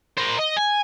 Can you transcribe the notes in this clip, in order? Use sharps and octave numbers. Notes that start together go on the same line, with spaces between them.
A#4 C5
D#5
G#5